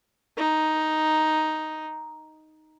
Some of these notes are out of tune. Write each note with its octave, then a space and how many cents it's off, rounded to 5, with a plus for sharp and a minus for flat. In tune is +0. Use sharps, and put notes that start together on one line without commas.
D#4 +5